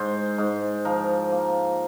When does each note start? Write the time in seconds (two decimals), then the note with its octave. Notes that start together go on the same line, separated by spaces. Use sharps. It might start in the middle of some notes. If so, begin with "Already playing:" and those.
Already playing: G#2 C5
0.38 G#2
0.85 F3 A#4
1.32 A#3